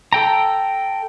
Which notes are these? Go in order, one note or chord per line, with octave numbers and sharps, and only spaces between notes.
A4 G5 A#5